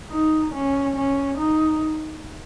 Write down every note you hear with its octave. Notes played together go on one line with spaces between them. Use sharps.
D#4
C#4
C#4
D#4